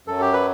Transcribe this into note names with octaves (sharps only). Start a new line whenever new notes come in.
F#2 F#3 A4
G4
B4